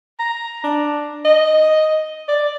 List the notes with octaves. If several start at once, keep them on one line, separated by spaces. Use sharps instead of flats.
A#5
D4
D#5
D5